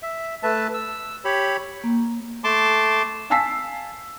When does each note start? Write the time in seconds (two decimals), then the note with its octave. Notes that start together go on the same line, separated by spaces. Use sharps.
0.03 E5
0.43 A3 B4 E5 A5
0.74 E6
1.25 G4 C#5 B5
1.84 A#3
2.44 A3 A5 C6 D6
3.30 F5 G#5 A5 E6 B6 C7